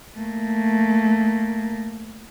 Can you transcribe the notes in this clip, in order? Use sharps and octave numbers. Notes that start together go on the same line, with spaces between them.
A3 A#3